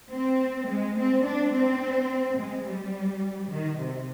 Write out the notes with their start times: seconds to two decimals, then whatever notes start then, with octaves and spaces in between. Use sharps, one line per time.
0.12 C4
0.68 G#3
0.97 C4
1.25 D4
1.53 C4
2.38 G#3
2.66 G3
3.51 D#3
3.79 C3